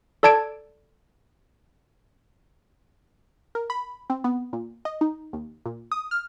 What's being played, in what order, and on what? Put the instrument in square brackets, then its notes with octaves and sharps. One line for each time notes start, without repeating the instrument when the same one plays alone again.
[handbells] A4 D5 A5 G#6 D7
[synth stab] A#4
B5
C4
B3
A#2
D#5
D#4
D#2
A#2
D#6
F6